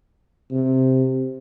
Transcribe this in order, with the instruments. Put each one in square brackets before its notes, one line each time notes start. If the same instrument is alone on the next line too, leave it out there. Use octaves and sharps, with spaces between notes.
[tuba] C3